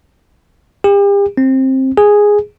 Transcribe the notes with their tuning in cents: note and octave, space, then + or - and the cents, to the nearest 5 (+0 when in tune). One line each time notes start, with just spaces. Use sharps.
G4 +40
C4 +15
G#4 -5